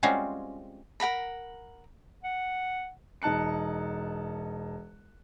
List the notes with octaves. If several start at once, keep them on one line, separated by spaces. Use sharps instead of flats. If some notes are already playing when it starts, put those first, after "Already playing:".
G3 G#3 C4 C#4 F4 F#4
A#4 F#5 A#5 B5
F#5
E1 D#4 A5 F#6 C#7